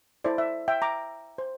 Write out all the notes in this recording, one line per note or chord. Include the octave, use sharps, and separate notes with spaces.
E4 A4 C5 D5
E5
E5 G5
A#5 D6
C5